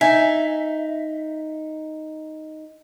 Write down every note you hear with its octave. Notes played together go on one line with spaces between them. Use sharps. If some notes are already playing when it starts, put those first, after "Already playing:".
D#4 E5 G#5